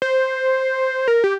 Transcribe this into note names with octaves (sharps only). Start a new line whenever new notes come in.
C5
A#4
G4